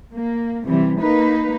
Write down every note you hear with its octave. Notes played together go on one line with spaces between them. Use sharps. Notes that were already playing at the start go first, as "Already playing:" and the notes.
A#3
C3 E3 G3
A#3 D#4 B4